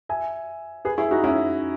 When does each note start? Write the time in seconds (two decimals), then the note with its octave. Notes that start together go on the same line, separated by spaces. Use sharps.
0.09 E5 G#5
0.85 G#4 B4
0.98 E4 G#4
1.11 D#4 F#4
1.24 C#4 E4